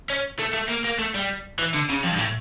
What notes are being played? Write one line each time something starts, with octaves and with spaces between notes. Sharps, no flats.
C#4
A3
A3
A#3
A#3
A3
G3
E3
D3
C#3
F2
G2
A2